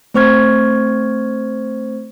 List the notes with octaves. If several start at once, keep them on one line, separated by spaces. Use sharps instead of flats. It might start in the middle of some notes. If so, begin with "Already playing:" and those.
A3 C4 C5 C#6 F6 G#6